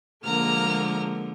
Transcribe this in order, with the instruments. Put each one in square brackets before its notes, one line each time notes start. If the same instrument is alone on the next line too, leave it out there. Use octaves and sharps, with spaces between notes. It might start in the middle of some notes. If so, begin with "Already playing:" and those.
[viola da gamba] D3 F3 [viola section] G#3 A#3 [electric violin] A#5 F6